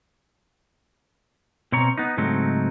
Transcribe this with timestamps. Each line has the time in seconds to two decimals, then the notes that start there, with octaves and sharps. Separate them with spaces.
1.72 B2 C4 C#5 A#5
1.98 B3 D#4
2.17 G#2 C#3 F#3 A3 C4 D#4